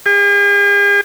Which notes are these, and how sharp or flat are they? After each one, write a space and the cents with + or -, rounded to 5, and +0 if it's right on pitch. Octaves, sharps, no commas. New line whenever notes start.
G#4 -45